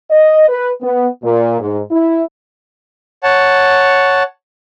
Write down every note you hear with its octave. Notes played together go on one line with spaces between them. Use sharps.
D#5
B4
B3
A#2
G#2
E4
C#5 F#5 A5